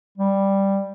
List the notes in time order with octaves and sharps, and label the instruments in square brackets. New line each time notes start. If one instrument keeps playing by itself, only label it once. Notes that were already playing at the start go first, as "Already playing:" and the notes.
[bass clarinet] G3